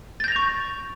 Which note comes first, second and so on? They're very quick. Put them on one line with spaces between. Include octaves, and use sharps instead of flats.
A6 G6 A#6 F7 C#6